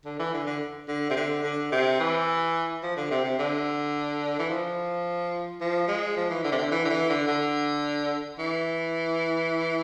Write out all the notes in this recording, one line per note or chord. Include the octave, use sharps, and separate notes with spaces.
D3
E3
D3
D3
D3
C3
D3
D3
C3
E3
F3
D3
C3
C3
D3
E3
F3
F3
G#3
F3
E3
D3
C3
D3
E3
D3
E3
D3
D3
E3